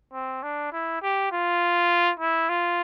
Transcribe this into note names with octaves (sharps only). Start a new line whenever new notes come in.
C4
D4
E4
G4
F4
E4
F4